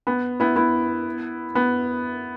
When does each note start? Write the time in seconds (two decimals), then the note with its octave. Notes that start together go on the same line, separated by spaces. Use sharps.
0.07 B3
0.40 B3 E4
0.56 B3 E4
1.55 B3